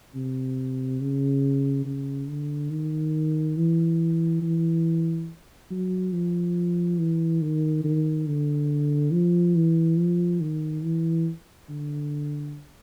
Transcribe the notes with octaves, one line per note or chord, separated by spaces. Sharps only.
C3
C#3
C#3
D3
D#3
E3
E3
F#3
F3
E3
D#3
D#3
D3
F3
E3
F3
D#3
E3
D3